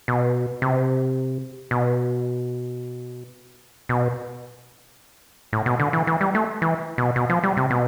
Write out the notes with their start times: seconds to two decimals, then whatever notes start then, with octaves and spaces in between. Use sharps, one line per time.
0.08 B2
0.62 C3
1.71 B2
3.89 B2
5.53 A2
5.66 B2
5.80 D3
5.93 E3
6.07 E3
6.21 G3
6.35 A3
6.62 E3
6.98 B2
7.16 B2
7.30 F3
7.43 G3
7.57 C3
7.71 B2